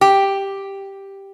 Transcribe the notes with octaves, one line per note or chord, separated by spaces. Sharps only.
G4